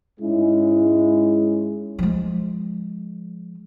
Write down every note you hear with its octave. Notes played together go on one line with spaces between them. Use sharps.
G#2 G#3 C#4 E4
F3 G#3